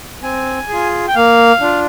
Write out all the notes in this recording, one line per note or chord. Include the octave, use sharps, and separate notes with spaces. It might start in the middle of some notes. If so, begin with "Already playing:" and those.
C4 G#5
F4 G#4
G5
A#3 F5
D4 F4